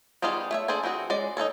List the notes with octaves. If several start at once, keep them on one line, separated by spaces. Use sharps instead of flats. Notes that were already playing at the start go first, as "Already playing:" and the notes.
G3 B3 D#4 F4 G#4
A3 C#5 E5
D4 G#4 A4 C5 G#5
E3 C4 F#4 G#4
G#3 C#4 D5
D#4 F#4 A4 C#5